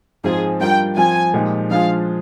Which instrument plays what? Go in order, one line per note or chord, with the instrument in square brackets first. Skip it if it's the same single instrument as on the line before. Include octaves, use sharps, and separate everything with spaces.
[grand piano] G#2 F3 C4 F4 [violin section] G#4
[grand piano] G3 D4 F4 A#4 [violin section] G5
[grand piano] F3 C4 F4 [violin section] G#5
[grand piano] A#2 F3 G#3 D#4 G4
[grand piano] F3 G#3 D4 F4 G#4 [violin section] F5